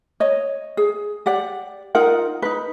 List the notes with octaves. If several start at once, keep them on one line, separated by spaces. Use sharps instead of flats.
C#5 D#5
G#4
G4 D5 F#5
D#4 F4 A#4 F#5
D#4 B4